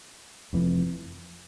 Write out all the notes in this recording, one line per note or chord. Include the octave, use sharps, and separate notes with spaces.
F1 F2 E3